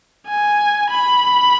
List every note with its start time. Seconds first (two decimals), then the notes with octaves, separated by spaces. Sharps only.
0.28 G#5
0.90 B5